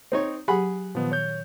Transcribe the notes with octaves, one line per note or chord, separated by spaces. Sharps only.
C4 D#4 C#5
F#3 G4 G#4 F#5 B5
A#2 D#3 F3 B3
C#5 G6